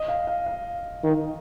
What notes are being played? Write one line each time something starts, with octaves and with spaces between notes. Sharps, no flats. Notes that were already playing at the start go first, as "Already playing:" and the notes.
Already playing: D#5
F5
F5
F5
D#3